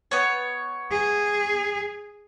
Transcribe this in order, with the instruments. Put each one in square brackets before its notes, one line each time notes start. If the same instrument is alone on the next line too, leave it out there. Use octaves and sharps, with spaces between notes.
[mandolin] B3 C#5
[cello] G#4